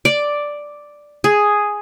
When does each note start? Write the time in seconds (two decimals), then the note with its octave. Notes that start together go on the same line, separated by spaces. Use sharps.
0.05 D5
1.24 G#4